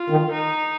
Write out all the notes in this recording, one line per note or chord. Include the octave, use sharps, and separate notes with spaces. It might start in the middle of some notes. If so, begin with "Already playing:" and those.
Already playing: F4
D#3
D#4